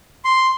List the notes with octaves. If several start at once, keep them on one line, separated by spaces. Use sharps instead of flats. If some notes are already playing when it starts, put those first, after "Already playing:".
C6